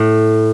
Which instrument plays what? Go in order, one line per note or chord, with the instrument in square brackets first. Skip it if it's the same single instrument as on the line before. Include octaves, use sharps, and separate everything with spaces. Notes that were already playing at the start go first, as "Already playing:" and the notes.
Already playing: [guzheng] A2